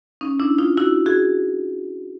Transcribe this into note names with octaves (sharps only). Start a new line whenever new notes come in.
C#4 D#4
D4 E4
D#4 F4
E4 F#4
F#4 G#4